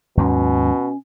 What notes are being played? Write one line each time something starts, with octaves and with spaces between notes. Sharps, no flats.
D#2 G#2 B2 F#3 C#4